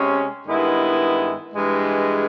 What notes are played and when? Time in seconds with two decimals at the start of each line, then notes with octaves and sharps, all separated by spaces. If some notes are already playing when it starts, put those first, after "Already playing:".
Already playing: C3 G#3 C#4
0.46 G2 D#3 G#3 B3 E4
1.55 G2 E3 G#3